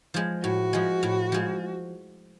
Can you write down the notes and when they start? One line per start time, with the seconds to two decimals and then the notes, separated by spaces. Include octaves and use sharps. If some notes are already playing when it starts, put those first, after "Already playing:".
0.14 F3 G#3
0.43 A2 F#4
0.73 F3 G#3
1.03 A2
1.32 F3 G#3